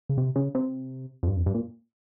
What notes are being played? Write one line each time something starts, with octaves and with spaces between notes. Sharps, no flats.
C#3
C3
C#3
C3
F2
G2
F2
G2
A#2